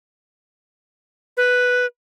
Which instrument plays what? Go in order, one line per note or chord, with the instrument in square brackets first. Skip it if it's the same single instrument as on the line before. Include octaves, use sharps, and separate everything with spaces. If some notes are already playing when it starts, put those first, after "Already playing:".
[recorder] B4